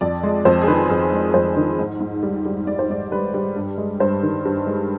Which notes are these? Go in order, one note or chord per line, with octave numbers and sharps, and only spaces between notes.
F2 D5
G#3
F2 C5
G#4
D#3 B4
F2 G#4
G#3
F2 C5
D#3
G#2
G#2
G3
G3
G#2 D5
C5
G#2 D5
G3 B4
G3
G2
G#3
G2 C5
D#3
G2
G#3